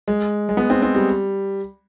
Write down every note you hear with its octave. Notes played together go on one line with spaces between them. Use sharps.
G#3
G#3
B3
C4
C4
G3